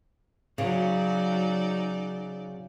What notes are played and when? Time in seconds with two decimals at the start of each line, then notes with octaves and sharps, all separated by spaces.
0.58 C#3 F#3 D#4 D5